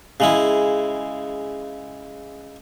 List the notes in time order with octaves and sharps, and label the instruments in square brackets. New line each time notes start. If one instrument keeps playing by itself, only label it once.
[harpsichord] C#3 G#3 E4